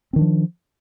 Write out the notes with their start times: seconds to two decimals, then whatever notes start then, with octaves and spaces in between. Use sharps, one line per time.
0.13 C4
0.16 D#3
0.19 D4
0.21 F3